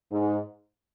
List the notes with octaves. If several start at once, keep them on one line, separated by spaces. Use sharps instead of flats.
G#2